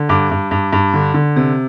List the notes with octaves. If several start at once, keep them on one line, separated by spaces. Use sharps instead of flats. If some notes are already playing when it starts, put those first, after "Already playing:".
Already playing: D3
G2 D6
G2
G2
G2
D3
D3
C3